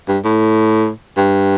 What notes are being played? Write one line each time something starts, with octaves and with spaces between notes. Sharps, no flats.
G2
A2
G2